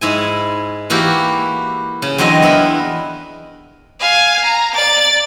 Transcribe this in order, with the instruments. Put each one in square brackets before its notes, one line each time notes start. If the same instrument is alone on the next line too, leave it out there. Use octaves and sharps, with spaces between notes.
[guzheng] G#2 E4 G#5
E3 A#3 E4 F#4 G4
C#3
E2 D3 F#3 C4 D#5
B3 E4 A#4 B4
[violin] F5 G#5
A#5
D5 A6